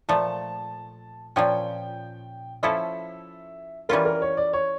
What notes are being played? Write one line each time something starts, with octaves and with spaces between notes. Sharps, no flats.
A#2 F3 A3 A5
A#2 F3 C#4 G5
F3 C#4 E4 A4 E5
E3 G3 C#4 F4 A#4
A#4
C#5
D5
C#5